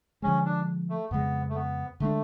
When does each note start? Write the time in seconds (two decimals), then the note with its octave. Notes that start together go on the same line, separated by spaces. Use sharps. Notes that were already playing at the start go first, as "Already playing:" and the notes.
0.22 D3 F3 G#3 C#4
0.45 D4
0.90 A3
1.11 F2 C#3 G#3 B3
1.49 A3
1.55 B3
2.00 D3 G#3 A3 D4